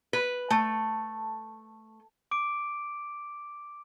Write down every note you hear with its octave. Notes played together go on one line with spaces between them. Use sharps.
B4
A3
D6 D7